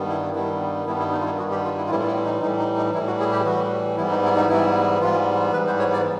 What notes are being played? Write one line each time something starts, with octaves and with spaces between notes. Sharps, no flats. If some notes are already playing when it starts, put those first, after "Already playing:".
Already playing: G2 D#3 G3 B3
E4
G2 D#3 G3 B3 E4
G2 D#3 G3 B3 E4
E4
D#4
F4
E4
G2 D#3 G3 B3 F#4
G4
F4
E4
F4
A2 E3 G3 E4
F4
E4
D#4
A2 E3 G3 D#4
D#4
D#4
A2 E3 G3 E4
F#4
G#4
G4
A2 E3 G3 F#4
G#2 E3 G3 B3 E4
D#4
E4
D#4
G#2 E3 G3 B3 E4
G#2 E3 G3 B3 F4
G#2 E3 G3 B3 B4
C5
C#5
D5